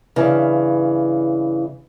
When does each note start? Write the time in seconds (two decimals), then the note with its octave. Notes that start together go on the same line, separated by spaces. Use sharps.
0.16 G2 C#3 E3